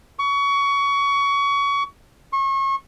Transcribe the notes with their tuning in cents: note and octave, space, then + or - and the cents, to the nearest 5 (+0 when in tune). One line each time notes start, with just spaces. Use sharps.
C#6 +25
C#6 -35